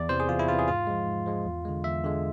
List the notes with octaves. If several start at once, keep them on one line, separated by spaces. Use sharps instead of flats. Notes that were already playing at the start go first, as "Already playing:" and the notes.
Already playing: E2 D5
C3 E3 C5
G#4
E2 F4
E4
C3 E3 F4
G#4
G#2 F4
F3 G#3
G#2
F3 G#3
E2
D3 G#3
E2 E5
D3 G#3